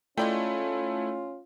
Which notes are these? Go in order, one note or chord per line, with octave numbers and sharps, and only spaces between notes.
G#3 A3 C#4 E4 F4 D5 G5